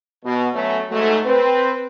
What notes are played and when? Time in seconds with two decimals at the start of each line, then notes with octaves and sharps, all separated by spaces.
0.24 B2
0.54 F#3 A3 B3 C#4
0.91 G#2 F#3 A3
1.25 C4 B4